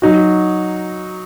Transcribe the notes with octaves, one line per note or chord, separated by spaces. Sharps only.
F#3 D#4 F#4